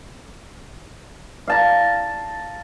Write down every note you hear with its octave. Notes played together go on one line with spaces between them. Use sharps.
F5 A5 A#5